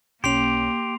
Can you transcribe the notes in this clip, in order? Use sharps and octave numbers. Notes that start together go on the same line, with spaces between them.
B1 A#3 C#4 G4 C6 C7 F7